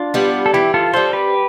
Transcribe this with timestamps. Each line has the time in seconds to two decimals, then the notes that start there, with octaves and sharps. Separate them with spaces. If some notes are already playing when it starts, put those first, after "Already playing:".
Already playing: D4 F4
0.14 G3 B3
0.46 A4
0.54 E3 E4 G4
0.74 F4 A4
0.93 G3 C4 A4 C5
1.13 G4 B4